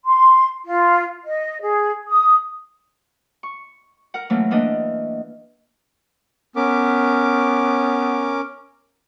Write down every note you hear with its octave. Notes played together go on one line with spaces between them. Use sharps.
C6
F4
D#5
G#4
D#6
C#6
A#4 F#5
E3 F#3 A3 A#3 C#4
E3 A#3 B3 D4 D#5
B3 C#4 A#4 D6